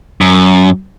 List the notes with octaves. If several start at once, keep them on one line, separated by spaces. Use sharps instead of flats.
F#2